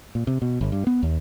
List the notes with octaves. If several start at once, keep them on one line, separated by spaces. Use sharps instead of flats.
A#2
C3
B2
G1
G2
B3
D#2